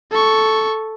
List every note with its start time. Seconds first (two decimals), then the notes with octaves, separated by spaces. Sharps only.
0.11 A4 C#6